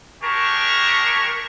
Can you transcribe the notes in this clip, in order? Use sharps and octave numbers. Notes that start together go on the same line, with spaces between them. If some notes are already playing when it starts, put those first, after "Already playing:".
D4 G4 G#4 A#4 A5 C#6